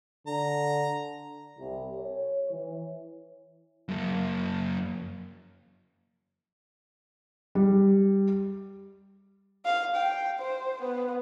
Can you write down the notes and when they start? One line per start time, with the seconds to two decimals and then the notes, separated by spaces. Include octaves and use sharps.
0.27 D3 A#5
1.59 C2
1.96 C#5
2.51 E3
3.89 F#2 A#3
7.55 G3
9.65 F5
9.96 G5
10.40 C5
10.82 B3